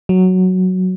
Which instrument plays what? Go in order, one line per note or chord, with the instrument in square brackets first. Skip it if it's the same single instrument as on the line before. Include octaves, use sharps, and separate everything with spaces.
[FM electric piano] F#3